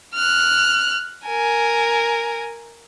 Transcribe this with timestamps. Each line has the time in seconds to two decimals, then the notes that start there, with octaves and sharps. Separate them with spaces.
0.15 F6 F#6
1.26 A#4 G#5